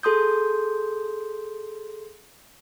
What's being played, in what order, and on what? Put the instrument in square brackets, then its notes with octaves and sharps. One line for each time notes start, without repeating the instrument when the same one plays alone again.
[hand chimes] G#4 A4 C6 D#6 G6